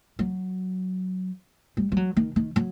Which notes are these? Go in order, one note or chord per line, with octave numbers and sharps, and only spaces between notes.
F#3
G3
G3
F#3
D#3
D#3
F#3